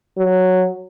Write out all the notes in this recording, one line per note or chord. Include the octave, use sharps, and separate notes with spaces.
F#3